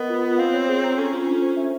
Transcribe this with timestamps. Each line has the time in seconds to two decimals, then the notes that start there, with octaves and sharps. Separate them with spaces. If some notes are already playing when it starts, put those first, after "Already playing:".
Already playing: B3 A#4 D#5
0.10 F4
0.23 F4
0.38 C4 F5
0.53 C#5
0.69 G#4
0.84 A#5
0.98 C#4 A4
1.13 F4
1.27 D4
1.42 C5
1.57 E5